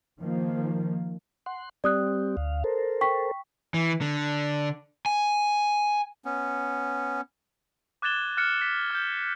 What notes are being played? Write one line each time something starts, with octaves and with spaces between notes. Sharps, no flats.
D#3 F3 A#3
F#5 C6
G3 C4 G4 D5 D#6 F#6
D2 F5
A4 A#4 C5
G5 C#6 B6
E3
D3
G#5
B3 C#4
D6 F#6 G#6 A6 E7 G7
F6 F#6 A6 C#7
B6
F6 G6